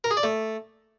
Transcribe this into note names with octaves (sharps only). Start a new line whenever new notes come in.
A#4
G#4
D5
A3